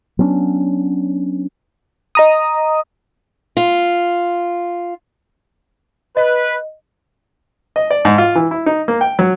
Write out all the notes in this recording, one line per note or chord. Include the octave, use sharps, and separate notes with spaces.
F#3 B3 C#4 D4
D#5 A#5 D#6
F4
B4 D#5
D#5
D5
G#2
F4
E3
E4
D#4
A#3
G5
F#3